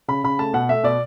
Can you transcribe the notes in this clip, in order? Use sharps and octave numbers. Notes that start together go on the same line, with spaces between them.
C#3 B5
C#3 B5
A3 A5
B2 F#5
A3 E5
B2 D5